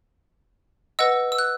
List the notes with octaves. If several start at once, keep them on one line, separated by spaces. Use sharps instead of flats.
B4 D#5 F#5 E6
E6
F#6